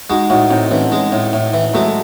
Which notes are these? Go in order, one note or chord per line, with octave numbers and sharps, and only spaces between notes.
G#3 D#4 F#4
A2 D#4 F#4
A2 C4 D#4
E3 A3 C#4
G#3
A2
A2
E3
F#3 G#3 A3